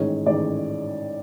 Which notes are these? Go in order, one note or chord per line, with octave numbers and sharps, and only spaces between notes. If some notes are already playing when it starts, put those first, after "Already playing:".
Already playing: A1 G#2 D#3 C#5
A1 G#2 D#3 D5